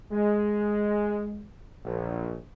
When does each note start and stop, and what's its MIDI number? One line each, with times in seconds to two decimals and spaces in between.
0.12 1.44 56
1.85 2.34 34